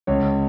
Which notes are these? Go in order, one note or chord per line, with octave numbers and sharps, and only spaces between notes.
C#2 C#5